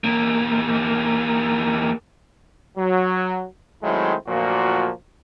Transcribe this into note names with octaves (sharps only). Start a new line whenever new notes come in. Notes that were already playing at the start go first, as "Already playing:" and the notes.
E2 A#3
F#3
D#3 F#3 G#3 A3 C4 E4
D2 A#2 F3 F#3 A#3 F#4